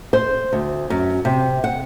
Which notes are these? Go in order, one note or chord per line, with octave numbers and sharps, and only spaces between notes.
C5
D2
F#2
C3
F#5